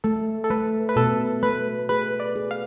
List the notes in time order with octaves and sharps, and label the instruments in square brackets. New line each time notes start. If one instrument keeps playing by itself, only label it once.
[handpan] A3 [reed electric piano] A4
[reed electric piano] A4
[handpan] A3 [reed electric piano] B4
[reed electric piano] B4
[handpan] B2 [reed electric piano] A4
[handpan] A3 [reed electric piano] B4
[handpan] G#4 [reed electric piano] B4
[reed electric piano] D5
[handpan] G#4
[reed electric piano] F5